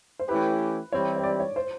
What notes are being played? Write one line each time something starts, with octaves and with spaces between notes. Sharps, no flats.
C5
E3 A3 C#4 E4 G4 B4
E3 G3 C4 E4 G4 C#5
C#5
D5
C#5
C5